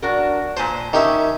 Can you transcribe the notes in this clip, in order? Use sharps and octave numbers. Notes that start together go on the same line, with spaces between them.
D4 F#4 A#4
A#2 C5 G#5 A5
D#3 C#4 G4 E5